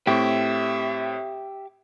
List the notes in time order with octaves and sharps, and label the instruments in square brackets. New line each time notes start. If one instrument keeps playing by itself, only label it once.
[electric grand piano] A2 C4 C#6 [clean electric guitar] G4 [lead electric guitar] E5